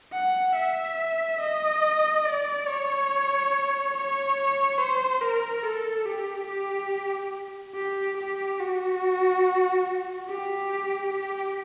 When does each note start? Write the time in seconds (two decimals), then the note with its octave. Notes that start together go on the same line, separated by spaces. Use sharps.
0.13 F#5
0.55 E5
1.40 D#5
2.25 D5
2.67 C#5
3.94 C#5
4.78 C5
5.21 A#4
5.63 A4
6.06 G4
6.47 G4
7.75 G4
8.17 G4
8.60 F#4
10.29 G4
11.13 G4